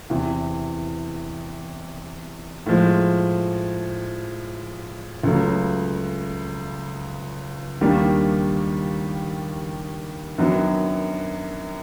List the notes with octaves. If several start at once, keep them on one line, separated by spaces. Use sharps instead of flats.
E2 C3 E3
A2 F3 G#3
C#2 C#3 F#3 A3
D#2 D#3 G3 A#3 D4
F#2 D#3 F#3 B3 D4